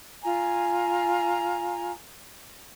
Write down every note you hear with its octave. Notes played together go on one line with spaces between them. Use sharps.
F4 G#5 A#5